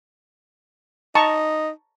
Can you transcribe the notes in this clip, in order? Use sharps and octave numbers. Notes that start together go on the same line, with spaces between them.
D#4 A5 A#5 C#6